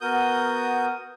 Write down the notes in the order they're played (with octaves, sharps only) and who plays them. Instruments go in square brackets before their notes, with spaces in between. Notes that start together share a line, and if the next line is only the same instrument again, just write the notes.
[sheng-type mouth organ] B3 F#4 A#4 D#6 G6